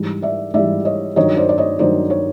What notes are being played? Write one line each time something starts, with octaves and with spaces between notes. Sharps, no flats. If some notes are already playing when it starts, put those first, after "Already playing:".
Already playing: G#2 E3 G3
D5 E5
G#2 E3 G3 D5 E5
C#5 D#5
G2 D#3 F#3 C#5 D#5
C5 D5
D5
C#5 D#5
G2 D#3 F#3 C5 D5
C#5